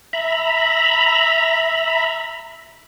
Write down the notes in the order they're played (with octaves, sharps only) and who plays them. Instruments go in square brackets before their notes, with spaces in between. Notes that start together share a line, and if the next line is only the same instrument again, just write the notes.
[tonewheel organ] E5 A#5 B5